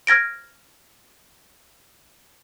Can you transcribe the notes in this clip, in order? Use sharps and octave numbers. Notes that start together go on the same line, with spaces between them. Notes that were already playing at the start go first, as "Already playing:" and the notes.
F6 G#6 A#6 D7